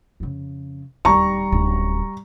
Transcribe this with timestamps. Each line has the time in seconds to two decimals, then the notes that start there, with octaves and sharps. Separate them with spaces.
0.20 F2 C#3
1.05 D1 D#2 G3 A#5 C#6
1.52 D1 C#4